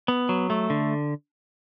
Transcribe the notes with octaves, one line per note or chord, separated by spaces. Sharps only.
B3
F#3
A3
D3